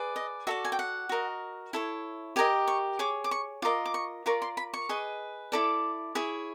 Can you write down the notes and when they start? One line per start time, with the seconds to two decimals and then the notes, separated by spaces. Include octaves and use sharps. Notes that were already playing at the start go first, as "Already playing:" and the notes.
Already playing: G#4 B4 D5
0.16 D#5
0.47 F#4 A4 D5 E5
0.65 G#5
0.72 G5
0.79 F#5
1.09 F#4 A#4 D#5
1.73 E4 A4 C#5
2.36 G4 A#4 D#5 G#5
2.67 C#6
2.99 G#4 C#5 D6
3.24 D6
3.31 C#6
3.62 F4 A#4 D#5 D6
3.85 D6
3.94 C#6
4.26 F4 A#4 D5 C#6
4.42 C6
4.57 B5
4.74 C#6
4.89 G#4 B4 D#5
5.52 E4 A4 D5 D6
6.15 E4 G#4 C#5